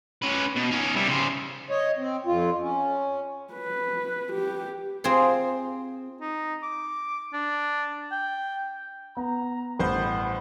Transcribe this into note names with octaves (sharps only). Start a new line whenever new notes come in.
C#4 B4
B2
C#4 D#4
G3 E4
C#3 C5
C#5 D#5
C4
F2 F4
C#4
B4
G4
C4 F4 G#4 C5
D#4
D6
D4
G5
B3 A#5
A1 G2 B3 C5 G6